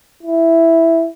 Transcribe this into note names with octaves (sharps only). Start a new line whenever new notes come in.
E4